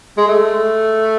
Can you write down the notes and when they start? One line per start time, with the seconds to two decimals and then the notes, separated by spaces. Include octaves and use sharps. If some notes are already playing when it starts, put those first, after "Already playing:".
0.17 G#3
0.28 A3